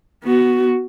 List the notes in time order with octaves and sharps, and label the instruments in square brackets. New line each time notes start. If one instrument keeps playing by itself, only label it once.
[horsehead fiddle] B3 F#4